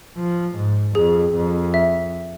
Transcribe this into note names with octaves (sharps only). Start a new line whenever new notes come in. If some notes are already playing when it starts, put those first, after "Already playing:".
F3
G#2
F2 G#4
F2
E5